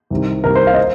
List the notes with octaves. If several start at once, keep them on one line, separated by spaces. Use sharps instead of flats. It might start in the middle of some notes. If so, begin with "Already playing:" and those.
C2 C3 D#3
C2 C3 D#3 A#4
C5
F5
D#5